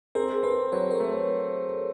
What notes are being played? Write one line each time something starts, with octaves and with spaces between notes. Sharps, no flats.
C4 G#4 A#4
C4 A4 B4
F#3 B4 C#5
A#4 C5
A3